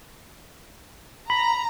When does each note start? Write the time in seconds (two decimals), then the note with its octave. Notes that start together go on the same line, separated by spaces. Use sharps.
1.30 A#5 B5